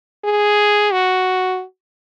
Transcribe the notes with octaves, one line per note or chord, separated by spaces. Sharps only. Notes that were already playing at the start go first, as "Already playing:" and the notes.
G#4
F#4